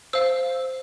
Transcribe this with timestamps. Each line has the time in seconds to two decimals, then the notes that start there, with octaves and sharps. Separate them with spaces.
0.13 C5 F5 E6